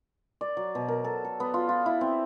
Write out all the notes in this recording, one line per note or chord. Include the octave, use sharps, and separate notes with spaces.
D5
F#3
B2
A#4
A4
A4
B3
F4
F4
E4
C4